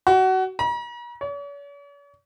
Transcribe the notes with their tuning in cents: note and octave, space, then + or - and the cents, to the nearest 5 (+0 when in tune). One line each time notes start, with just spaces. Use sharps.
F#4 +25
A#5 +45
C#5 +45